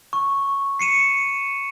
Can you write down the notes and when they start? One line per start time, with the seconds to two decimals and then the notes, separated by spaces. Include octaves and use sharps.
0.13 C#6
0.79 C7 C#7 D#7 E7